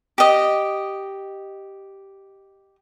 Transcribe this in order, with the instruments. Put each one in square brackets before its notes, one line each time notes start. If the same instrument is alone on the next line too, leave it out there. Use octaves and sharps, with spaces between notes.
[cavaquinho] G4 D#5